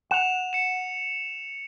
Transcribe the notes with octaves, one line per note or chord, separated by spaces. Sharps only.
F#5 E7 F7
C#7 E7